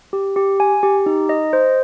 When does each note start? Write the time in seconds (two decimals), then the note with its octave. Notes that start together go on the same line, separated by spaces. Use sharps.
0.13 G4
0.36 G4
0.60 G#5
0.83 G4
1.06 D#4
1.29 D#5
1.53 C5